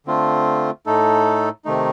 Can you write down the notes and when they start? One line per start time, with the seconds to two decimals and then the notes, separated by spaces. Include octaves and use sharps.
0.07 D3 A3 C4 F4
0.86 A2 A3 D#4 A4
1.65 C3 D#3 A3 D#4